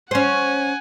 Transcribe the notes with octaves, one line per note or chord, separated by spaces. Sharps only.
C#4 C5 F#5 G#5